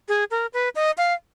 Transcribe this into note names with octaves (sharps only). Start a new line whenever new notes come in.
G#4
A#4
B4
D#5
F5